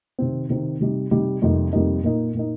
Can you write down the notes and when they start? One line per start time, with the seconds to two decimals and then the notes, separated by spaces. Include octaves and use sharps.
0.19 C3 D#3 C4
0.50 C3 D#3 C4
0.80 C3 G3 D#4
1.11 C3 G3 D#4
1.42 F2 C3 G3 A#3 D#4
1.73 F2 C3 G3 A#3 D#4
2.04 A#2 A#3 D#4
2.35 A#2 A#3 D#4